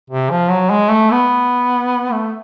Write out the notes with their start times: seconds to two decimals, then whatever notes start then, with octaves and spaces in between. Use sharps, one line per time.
0.10 C3
0.31 F3
0.50 F#3
0.70 G#3
0.91 A3
1.11 B3
2.12 A3